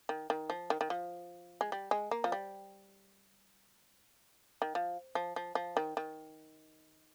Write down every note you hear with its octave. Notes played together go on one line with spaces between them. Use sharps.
D#3
D#3
F3
D#3
D#3
F3
G#3
G3
G#3
A#3
F3
G3
D#3
F3
F3
F3
F3
D#3
D#3